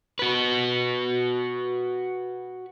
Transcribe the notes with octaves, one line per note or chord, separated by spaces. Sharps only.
F#4 B4